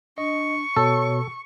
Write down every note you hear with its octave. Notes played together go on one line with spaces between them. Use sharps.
D4 D#5 C#6
B2 A4 C#5